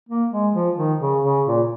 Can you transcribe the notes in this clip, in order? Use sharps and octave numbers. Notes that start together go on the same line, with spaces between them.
A#3
G#3
F3
D#3
C#3
C#3
A#2